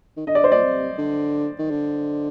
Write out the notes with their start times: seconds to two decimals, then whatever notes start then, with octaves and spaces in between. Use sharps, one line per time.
0.17 D#3
0.26 D3 D#5
0.35 D5
0.44 C5
0.52 A#2 D5
0.63 C3
0.98 D3
1.58 D#3
1.70 D3